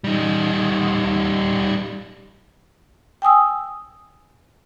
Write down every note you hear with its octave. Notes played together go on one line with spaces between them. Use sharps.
G3 D#4
G5 G#5 D#6 E6